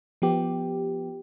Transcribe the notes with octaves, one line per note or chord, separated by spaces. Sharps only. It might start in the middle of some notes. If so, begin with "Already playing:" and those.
F3 B3 G4